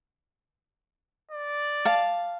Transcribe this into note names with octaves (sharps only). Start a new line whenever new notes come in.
D5
F5 A5